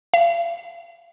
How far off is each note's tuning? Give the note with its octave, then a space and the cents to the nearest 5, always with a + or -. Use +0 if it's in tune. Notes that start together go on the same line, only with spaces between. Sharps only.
F5 -40